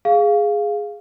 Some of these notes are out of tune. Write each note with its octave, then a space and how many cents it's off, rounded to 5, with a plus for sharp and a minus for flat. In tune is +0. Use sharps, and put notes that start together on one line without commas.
G#4 +0 F5 +0